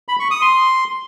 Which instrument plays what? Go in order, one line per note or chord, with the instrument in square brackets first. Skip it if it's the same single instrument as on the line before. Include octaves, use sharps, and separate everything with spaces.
[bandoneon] B5
C#6
D#6
C6